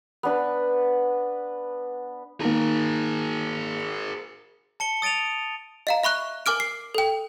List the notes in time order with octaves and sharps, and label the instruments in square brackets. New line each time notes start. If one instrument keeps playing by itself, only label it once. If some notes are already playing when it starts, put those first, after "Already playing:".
[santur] B3 D4 B4
[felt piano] D#3 A#3 [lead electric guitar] G#4 A#4
[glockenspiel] A5 C#7 G7
D#6 A6 D7 D#7 F7
[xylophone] D#5 F5 A#5
E5 B5 C#6 F#6
A#4 G#5 D6 F6 D7
C7
A4 G5